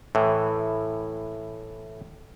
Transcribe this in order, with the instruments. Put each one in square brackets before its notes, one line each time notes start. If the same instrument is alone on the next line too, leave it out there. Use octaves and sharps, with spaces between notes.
[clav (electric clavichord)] A2 E3